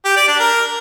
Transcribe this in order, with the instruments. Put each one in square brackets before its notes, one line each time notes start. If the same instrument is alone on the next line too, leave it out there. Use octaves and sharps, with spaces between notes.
[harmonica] G4
D5
D4
A#4